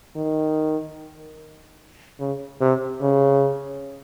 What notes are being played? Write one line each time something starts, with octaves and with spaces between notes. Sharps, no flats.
D#3
C#3
C3
C#3